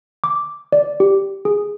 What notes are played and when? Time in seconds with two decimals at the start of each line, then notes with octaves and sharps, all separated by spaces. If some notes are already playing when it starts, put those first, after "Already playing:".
0.24 D6
0.72 D5
1.00 G4
1.45 G#4